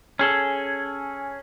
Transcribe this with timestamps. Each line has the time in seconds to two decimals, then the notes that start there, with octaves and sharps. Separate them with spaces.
0.19 C#4 G#4 A4